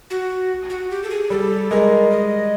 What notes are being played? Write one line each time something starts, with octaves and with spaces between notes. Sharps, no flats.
F#4
F#4
G4
A4
G#4
G3 A4
G#3 A#4
D#5